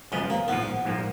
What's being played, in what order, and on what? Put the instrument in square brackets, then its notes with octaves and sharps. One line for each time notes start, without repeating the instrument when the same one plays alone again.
[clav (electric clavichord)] F#2 C#3 F3 B3 [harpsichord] G#3
[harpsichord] A#3
[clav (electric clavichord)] A#1 G#2 F3 [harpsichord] B3
[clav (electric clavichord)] A#1 G#2 F3 A#3